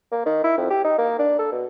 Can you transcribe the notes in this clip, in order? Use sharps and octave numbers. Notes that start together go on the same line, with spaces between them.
A#3
D#3
E4
F2
G4
D#4
A#3
D4
A4
B2